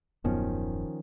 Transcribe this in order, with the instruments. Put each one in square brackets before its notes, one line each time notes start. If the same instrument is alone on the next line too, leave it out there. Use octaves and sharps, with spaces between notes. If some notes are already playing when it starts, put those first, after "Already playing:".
[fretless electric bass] D#1 F#2 B3 [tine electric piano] D#3 F3 C#4